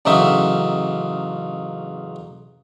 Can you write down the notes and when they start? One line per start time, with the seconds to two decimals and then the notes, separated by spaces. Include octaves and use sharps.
0.05 A1 C#3 F#3 D#4 E5